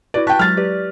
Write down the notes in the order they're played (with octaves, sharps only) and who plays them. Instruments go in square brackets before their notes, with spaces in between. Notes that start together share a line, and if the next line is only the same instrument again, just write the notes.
[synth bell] E4 F#4 B4 [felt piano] D5
[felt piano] G5 A5 [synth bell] C#6 F#6 B6
[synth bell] F#3 G#3 [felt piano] F6 A6
[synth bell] G4 B4 D5